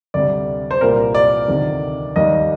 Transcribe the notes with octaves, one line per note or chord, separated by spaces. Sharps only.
D2 C3 G3 D5
C5
C2 A#2 G3 A#4
D5
D2 C3 D#3
D#2 D#3 G3 D#5